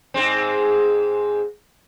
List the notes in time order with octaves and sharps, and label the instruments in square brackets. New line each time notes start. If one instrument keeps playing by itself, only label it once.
[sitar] G#2 G#3 C4